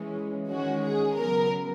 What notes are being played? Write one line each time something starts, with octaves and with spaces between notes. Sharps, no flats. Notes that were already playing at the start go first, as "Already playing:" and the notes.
Already playing: E3 G#3 C#4
D#3 G#3 C#4 F#4
G#4
C#3 F#3 B3 A#4